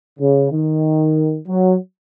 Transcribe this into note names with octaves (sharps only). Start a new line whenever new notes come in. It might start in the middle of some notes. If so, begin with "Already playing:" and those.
C#3
D#3
F#3